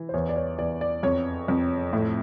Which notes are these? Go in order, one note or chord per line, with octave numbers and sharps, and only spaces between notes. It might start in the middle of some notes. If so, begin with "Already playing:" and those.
Already playing: E3
C5
E2 C#5
D5
C#5
E2 D5
D5
F2 C#5
F2
A2